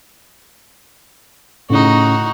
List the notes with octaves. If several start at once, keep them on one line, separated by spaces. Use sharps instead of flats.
A2 C#3 D#4 F#4